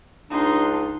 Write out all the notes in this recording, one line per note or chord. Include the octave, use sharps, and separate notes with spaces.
C#2 D4 D#4 C6